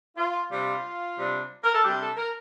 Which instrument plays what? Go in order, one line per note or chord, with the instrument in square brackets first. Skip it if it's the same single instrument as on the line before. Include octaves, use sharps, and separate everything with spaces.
[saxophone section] F4
C3 G3 D4 F4
C3 G3 D4
A#4
A4
C3 G3 D4 G4
A4
A#4